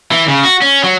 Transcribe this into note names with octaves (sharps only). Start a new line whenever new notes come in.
E3
C#3
F#4
C#4
F#3